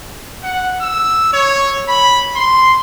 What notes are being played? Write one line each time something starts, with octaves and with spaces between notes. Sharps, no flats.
F#5
E6
C#5
B5
C6